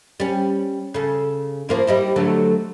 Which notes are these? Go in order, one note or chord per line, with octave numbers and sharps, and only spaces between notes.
G3 C#4
C#3 A4
F3 A#3 E4
G3 D#4 E4
D3 F#3 A3